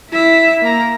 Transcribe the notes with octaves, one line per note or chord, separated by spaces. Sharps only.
E4 E5
A#3 A#5